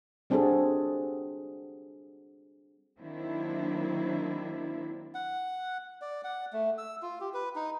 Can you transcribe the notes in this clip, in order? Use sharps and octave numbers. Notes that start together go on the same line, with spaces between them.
G3 C4 D4 F#4 G#4 A4
D#3 F#3 A#3 C4 D4 E4
F#5
D5
F#5
A3
E6
F4
G4
B4
D#4